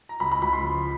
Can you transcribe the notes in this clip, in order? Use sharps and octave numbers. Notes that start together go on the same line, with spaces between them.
A#5
C#2 B5
B5
C#2 B5
C6
F3